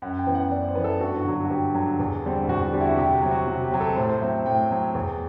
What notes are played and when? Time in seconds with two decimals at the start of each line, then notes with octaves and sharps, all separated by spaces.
0.02 F#2 F#5
0.19 G5
0.27 E3 B3
0.35 F#5
0.51 F#2 D5
0.68 C5
0.75 E3 B3
0.84 A4
1.00 G2 F#4
1.17 F#4
1.25 D3 F#3
1.33 F#4
1.45 F#4
1.50 G2 G4
1.74 D3 F#3
1.99 E2
2.23 D3 G3 C4
2.48 E2 F#4
2.61 F#4
2.73 D3 G3 C4 G4
2.80 E4
2.85 F#4
2.97 C3 G4
3.15 F#4
3.22 F#3 C4
3.31 F#4
3.47 C3 F#4
3.64 G4
3.72 F#3 C4
3.81 A4
3.96 A2 C5
4.09 C5
4.21 F#3 C4 E5
4.46 A2 G5
4.71 F#3 C4
4.95 E2